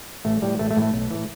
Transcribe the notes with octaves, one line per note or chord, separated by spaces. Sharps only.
A1 A3
A2 E3 G3
A1 A3
A3
A2 E3
A3
B1
A2 E3